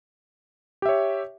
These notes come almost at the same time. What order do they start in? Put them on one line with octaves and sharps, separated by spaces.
G4 E5 C#5